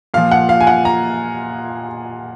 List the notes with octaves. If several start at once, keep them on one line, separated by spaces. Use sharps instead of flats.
A#2 F3 F5
F#5
F5
G#5
F#5
A#5